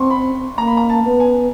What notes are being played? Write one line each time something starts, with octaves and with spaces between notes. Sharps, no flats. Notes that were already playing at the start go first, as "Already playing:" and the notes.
Already playing: C4 C6 C#6
B5
A#3 A#5
B5
A#5
A5
B3
G#5